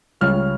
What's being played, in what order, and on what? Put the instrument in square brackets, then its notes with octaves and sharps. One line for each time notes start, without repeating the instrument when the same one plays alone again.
[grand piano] C#2 C#3 G3 C#4 F6